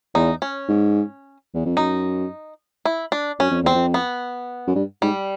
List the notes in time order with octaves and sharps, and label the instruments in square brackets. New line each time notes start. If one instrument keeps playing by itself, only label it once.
[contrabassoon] E2 [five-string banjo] D#4
[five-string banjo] C#4
[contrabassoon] G#2
E2
F2
[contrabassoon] F#2 [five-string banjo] D#4
[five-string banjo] E4
D4
[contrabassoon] F#2 [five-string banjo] C#4
[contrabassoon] F2
[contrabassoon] E2 [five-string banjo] C4
[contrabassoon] F2
[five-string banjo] B3
[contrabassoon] F#2
G2
[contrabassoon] G#2 [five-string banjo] G3